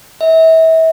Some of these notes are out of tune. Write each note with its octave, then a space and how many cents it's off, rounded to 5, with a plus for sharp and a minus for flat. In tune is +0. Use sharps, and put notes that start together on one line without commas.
E5 -35